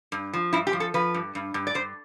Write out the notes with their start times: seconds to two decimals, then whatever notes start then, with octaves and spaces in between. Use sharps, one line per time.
0.12 G2
0.34 F3
0.53 G2 E4
0.67 G4
0.73 F3
0.80 A4
0.94 F3 B4
1.14 G2
1.35 G2
1.54 G2
1.67 D5
1.74 G2 C5